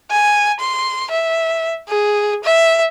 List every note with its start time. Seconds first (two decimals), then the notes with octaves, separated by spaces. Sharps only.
0.11 G#5
0.59 C6
1.11 E5
1.89 G#4
2.44 E5